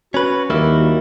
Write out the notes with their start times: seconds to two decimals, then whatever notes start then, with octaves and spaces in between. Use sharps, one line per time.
0.14 C#4 F#4 B4
0.50 D#2 G3 A#3 E4